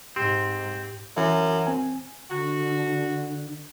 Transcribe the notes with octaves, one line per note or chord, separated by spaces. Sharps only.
G#2 C4 G4
F#2 E3 E5
C4 G#5
D3 F#4